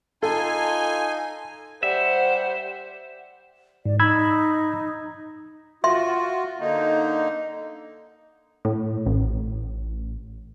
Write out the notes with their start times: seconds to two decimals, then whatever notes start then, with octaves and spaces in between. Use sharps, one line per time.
0.23 D#4 F4 A4 G#5
1.83 G3 C5 E5 F#5
3.86 G#2 D5
4.00 D#4 B5 E6 G#6
5.84 F4 F#4 E5 C6
6.60 D3 A#3 D#4
8.65 A2
9.06 A1